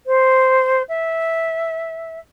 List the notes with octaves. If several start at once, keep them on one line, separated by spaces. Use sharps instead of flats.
C5
E5